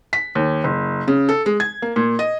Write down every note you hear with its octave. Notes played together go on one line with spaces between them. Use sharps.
B6
D#2
F#1
C#3
A4
G#3
G#6
A#3
A#2
D#5